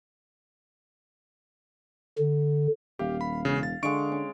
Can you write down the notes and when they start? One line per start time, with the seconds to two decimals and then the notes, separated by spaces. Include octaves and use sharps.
2.18 D3
2.99 D#1 G4 F5
3.21 B5
3.45 E1 C#3
3.63 A6
3.83 D3 G#3 F5 C#6 D7
4.12 C#4